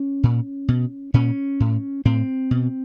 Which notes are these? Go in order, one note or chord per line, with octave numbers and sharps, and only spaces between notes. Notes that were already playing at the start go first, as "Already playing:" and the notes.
Already playing: C#4
A#2
B2
A#2 C#4
A2
A2 C4
B2